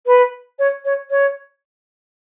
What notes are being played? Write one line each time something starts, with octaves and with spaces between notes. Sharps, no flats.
B4
C#5
C#5
C#5